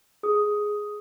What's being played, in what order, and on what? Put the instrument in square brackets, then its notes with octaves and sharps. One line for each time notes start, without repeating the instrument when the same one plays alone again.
[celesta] G#4 D#6